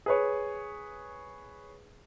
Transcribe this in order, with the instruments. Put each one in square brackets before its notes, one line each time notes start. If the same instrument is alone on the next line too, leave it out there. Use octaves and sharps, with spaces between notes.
[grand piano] G#4 B4 C#5